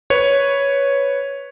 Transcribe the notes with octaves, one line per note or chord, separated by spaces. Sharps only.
B4 C#5